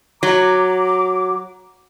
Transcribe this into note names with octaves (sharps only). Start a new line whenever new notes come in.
F#3 A#5 D6